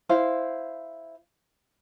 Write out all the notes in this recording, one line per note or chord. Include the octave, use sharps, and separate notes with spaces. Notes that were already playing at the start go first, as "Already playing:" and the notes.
E4 C5 F5